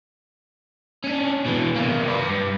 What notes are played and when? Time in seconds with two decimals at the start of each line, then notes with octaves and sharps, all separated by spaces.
1.04 C#4 D4
1.46 B2 E3
1.76 C3 A#3
2.08 B4 D5
2.29 G2